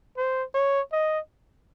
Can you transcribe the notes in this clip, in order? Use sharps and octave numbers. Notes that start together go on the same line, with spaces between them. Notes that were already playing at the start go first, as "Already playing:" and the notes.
C5
C#5
D#5